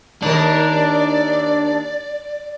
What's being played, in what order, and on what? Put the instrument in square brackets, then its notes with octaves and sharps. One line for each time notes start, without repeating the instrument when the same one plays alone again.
[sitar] D#2 A#4 [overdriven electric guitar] D4 [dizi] D5